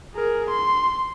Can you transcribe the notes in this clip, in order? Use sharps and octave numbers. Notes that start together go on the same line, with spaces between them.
G#4 A#4
C6